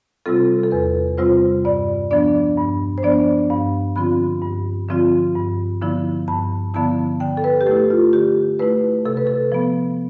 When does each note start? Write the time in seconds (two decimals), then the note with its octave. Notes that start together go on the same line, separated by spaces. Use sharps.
0.26 C3 G3 C4 F4 A4
0.63 A4
0.71 E2 B4
1.18 C3 G3 C4 F4 C5
1.65 G2 D5
2.11 F3 B3 D4 D5
2.57 G2
2.98 C5
3.03 F3 B3 D4 D5
3.50 G2 F5
3.96 D3 F3 C4 F4 B5
4.42 G2
4.89 D3 F3 C4 F4
5.36 G2
5.81 D3 F3 B3 E4
6.28 G2 A5
6.74 D3 F3 B3 E4 A5
7.20 D3 G5
7.37 A4
7.44 B4
7.61 G4
7.67 A3 E4 A4
7.90 F4
8.13 D3 G4
8.59 A3 E4 B4
9.05 C3 A4
9.17 B4
9.27 A4
9.52 F3 B3